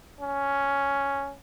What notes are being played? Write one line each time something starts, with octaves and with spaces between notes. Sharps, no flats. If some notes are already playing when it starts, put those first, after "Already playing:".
C#4